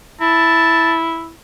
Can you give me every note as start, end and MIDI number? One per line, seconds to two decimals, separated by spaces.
0.21 1.33 64
0.21 0.94 81